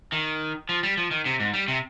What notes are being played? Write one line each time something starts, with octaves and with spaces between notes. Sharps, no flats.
D#3
F3
G3
F3
D#3
C3
G#2
G3
C3